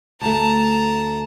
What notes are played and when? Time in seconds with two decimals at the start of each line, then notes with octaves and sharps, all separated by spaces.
0.21 D2 A3 A5 A#5